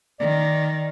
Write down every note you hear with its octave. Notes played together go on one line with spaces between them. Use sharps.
D#3 D5